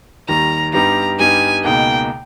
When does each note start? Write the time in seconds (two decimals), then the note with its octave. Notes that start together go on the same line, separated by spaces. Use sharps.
0.28 D#2 D#3 G3 A#5
0.73 G2 G3 B3 D#4 G4 A#5
1.19 G2 G3 B3 D#4 G4 G#5
1.64 C#2 B2 A#3 D#4 G#4 G5